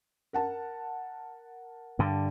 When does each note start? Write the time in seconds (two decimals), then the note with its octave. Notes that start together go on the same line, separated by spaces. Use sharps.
0.33 A#4 F#5 A5
1.99 G2 D3